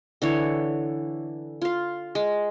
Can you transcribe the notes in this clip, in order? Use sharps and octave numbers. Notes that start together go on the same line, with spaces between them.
D3 E3 C#5
F4 F5
G#3